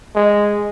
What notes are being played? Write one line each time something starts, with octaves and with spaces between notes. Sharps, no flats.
G#3